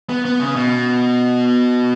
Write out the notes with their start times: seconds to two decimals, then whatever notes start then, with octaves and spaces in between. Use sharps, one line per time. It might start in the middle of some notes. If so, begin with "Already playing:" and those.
0.09 B3
0.25 B3
0.40 C#3
0.56 B2